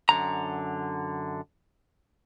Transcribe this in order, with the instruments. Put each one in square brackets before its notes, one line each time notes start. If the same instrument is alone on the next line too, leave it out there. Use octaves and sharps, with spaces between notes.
[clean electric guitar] F#2 D3 A#5